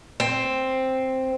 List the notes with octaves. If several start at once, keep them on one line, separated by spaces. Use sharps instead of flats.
C4